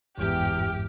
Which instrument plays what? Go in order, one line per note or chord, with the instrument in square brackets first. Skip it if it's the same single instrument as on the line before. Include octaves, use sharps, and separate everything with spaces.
[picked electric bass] G1 G#2 [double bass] E2 [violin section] G4 [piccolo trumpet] F6